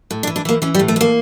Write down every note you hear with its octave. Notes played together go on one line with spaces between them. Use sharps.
A2
D4
E3
D4
E3 A#3
E3 C#4
G3
A2
A3
A2 A#3